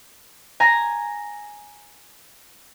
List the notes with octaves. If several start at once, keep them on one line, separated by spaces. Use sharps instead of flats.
G#5 A#5 A#6